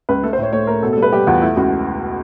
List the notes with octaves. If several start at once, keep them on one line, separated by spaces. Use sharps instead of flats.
C#2 B4
A3 A4
C5
A2 C#5
A3 C#5
A3 A#4
B2 A4
A4
G3
B4
G3 G4
E2 F4
A3 E4
C#2 F#4